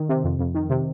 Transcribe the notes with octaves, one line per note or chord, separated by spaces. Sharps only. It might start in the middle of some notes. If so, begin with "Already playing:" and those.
Already playing: D#3
C3
F2
F2
D#3
C3